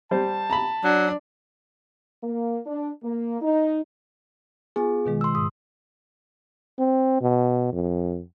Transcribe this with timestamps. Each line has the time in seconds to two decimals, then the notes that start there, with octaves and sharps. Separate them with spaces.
0.11 G3 C5 A5
0.50 A#5 B5
0.84 F#3 D4
2.23 A#3
2.66 D4
3.02 A#3
3.41 D#4
4.76 B3 F4 G#4 G#5
5.06 B2 D#3 G#3
5.21 C6 E6
5.35 G#2 D#6
6.79 C4
7.21 B2
7.73 F2